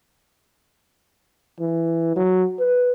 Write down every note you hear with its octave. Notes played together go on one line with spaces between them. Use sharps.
E3
F#3
B4